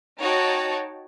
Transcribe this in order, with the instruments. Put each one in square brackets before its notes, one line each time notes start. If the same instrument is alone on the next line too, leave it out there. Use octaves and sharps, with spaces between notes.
[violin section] D#4 F#4 C#5 G5 A5